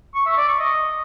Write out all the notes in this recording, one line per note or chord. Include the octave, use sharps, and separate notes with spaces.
C#6
E5
D5
C#6
D#5